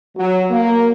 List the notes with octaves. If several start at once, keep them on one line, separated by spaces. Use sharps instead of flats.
F#3
A#3